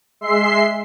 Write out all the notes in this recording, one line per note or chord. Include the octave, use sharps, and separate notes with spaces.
G#3 E5 C6 C7